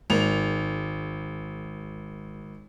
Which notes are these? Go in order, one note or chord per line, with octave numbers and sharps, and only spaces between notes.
G#1 F7